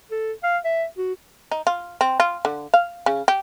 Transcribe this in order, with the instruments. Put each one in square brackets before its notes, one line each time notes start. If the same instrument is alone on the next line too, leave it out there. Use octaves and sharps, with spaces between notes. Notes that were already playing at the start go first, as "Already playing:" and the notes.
[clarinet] A4
F5
E5
F#4
[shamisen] D#4
F4
C4
F4
D3
F5
C#3
G4